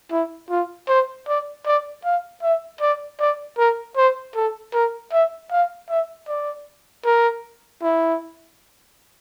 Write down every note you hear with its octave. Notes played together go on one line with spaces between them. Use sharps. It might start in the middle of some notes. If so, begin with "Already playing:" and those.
E4
F4
C5
D5
D5
F5
E5
D5
D5
A#4
C5
A4
A#4
E5
F5
E5
D5
A#4
E4